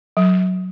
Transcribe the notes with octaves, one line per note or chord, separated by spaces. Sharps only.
F#3